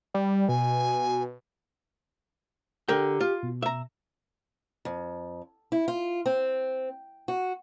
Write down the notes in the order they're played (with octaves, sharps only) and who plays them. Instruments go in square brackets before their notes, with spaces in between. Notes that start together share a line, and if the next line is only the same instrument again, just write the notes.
[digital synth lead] G3
[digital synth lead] B2 [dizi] G#5
[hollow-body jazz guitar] D3 A#4 G5 [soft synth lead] G4
[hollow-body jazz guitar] F4
[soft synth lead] B2
[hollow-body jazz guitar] E5 A#5
[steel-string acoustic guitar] F2
E4
F4
C4
F#4